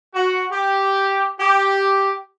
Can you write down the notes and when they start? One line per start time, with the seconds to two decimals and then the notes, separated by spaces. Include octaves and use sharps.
0.14 F#4
0.51 G4
1.39 G4